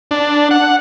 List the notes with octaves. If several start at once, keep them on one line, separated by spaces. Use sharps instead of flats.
D4
F#5